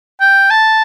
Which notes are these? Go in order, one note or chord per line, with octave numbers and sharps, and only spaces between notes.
G5
A5